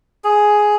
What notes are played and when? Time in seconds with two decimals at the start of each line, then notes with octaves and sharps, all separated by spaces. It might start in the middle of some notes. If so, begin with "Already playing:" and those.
0.24 G#4